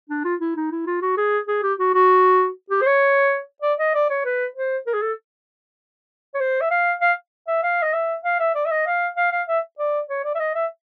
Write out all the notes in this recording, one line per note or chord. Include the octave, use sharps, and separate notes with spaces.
D4
F4
E4
D#4
E4
F4
F#4
G#4
G#4
G4
F#4
F#4
G4
C5
C#5
D5
D#5
D5
C#5
B4
C5
A#4
G#4
A4
C#5
C5
E5
F5
F5
E5
F5
D#5
E5
F5
E5
D5
E5
D#5
F5
F5
F5
E5
D5
C#5
D5
E5
D#5
E5